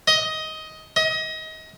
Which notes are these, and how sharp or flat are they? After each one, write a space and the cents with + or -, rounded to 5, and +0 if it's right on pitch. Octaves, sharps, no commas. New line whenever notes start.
D#5 +15
D#5 +30